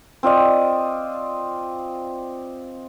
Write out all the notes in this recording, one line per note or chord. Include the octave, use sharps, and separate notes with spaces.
C4 F4 D5 D#5